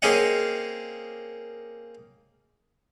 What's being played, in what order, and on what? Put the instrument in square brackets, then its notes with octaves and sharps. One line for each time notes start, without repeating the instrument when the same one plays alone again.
[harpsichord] A#3 C4 C#4 G#4 D#5 F#5